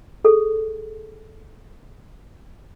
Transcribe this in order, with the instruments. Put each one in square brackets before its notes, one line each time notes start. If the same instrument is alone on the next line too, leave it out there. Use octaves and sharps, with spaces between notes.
[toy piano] G#4 A4